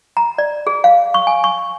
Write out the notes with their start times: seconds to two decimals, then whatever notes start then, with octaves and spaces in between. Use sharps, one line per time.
0.17 A#5
0.38 D5
0.67 G#4
0.84 F5
1.14 C#6
1.27 G#5
1.44 C#6